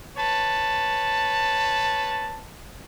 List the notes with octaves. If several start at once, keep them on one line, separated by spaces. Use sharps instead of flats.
B4 C#5 A5